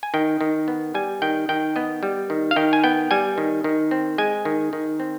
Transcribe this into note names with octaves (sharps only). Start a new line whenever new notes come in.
G#5
D#3 G5
D#3
B3
G3 G#5
D#3 G5
D#3 G5
B3 D#5
G3
D#3
F5
D#3 G5
G#5
B3 G5
G3 G#5
D#3
D#3
C4
G#3 G#5
D#3
D#3
C4